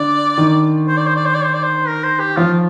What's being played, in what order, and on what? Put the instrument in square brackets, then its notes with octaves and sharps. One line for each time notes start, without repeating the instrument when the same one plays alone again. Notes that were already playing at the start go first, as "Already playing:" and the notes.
Already playing: [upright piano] D3 [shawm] D5
[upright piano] D#3
[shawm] C5
D5
C5
D5
C5
D5
C5
D5
C5
A#4
C5
G4
[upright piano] F3 [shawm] F4